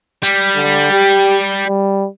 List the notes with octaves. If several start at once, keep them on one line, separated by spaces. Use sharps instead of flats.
G3
D3
G4
G3